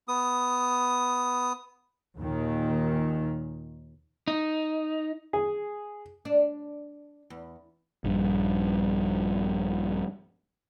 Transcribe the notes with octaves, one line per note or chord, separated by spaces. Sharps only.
B3 D#6
D#2 A#2 D#3
D#4
G#4
D4
E2
A#1 G2